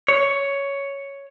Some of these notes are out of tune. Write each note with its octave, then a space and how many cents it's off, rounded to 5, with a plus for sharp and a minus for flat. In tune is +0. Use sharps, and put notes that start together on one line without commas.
C#5 +5